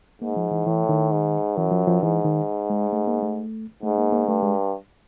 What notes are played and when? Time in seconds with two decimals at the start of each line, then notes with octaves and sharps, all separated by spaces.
0.22 G#2 A#3
0.36 F3
0.51 E3
0.67 A2 E3
0.89 D#3
1.11 G#2
1.57 F#2 E3
1.72 F3
1.88 F3
2.02 G#2 E3
2.25 D#3
2.70 G#3
2.93 A3
3.08 A#3
3.23 A3
3.83 G#2 A3
3.98 A#3
4.12 A#3
4.28 G2 A3
4.43 G#3